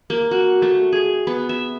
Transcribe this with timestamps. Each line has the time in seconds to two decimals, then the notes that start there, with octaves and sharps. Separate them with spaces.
0.10 A#3
0.31 F#4
0.62 A3
0.92 G#4
1.27 B3
1.49 E5